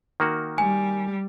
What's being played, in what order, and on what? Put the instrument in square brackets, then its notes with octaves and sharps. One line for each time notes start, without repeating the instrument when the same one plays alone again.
[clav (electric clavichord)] D#3 A#3 F#4
[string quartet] G3 [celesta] G#5